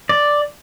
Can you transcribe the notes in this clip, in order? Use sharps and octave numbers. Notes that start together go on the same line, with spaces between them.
D5